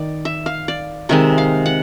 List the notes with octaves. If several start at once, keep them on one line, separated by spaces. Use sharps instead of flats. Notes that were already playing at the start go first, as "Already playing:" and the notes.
Already playing: D#3 D5
E5
F5
D5
C3 D#3 G#3 E5
F5
F#5